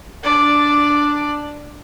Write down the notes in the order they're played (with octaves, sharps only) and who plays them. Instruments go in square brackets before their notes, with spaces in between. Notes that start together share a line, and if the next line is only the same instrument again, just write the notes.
[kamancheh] D4 D5